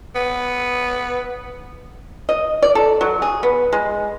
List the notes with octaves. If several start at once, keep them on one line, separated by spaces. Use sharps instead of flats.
B3
D#5
D5
A4
F#3
G#4
B3
G#3